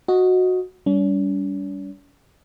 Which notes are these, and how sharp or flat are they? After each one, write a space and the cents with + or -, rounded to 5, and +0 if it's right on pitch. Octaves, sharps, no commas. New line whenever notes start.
F#4 -10 D#5 +10
G3 +0 C#4 +45